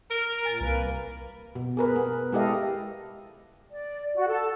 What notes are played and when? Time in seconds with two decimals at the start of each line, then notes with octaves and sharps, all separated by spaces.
0.10 A#4
0.45 A#2 G#5 A6
0.61 C2 A#3 B4
1.55 B2
1.77 G#4 A#4 B4
1.96 B3
2.32 G#3 E4 G4 A4 D#5 F5
3.71 D5
4.16 F#4
4.28 A4